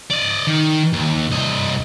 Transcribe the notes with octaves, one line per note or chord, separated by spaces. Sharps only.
D5 D#5
D#3
D#2
C2 D#5